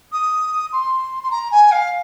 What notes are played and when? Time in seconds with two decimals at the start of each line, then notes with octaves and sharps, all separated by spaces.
0.12 D#6
0.72 C6
1.22 C6
1.30 A#5
1.51 G#5
1.71 F5